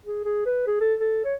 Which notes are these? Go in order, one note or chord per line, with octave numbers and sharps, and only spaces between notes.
G#4
G#4
B4
G#4
A4
A4
C#5